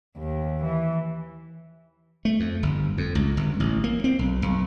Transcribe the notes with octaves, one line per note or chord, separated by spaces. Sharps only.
D#2
E3
A3
F2
G1
F2
C#2
G1
A1
A#3
C4
B1
B1